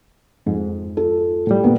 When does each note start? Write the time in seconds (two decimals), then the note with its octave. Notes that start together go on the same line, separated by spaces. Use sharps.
0.46 F2 G#2
0.97 F4 A4
1.47 A2 G3
1.64 A#2 A#3 B3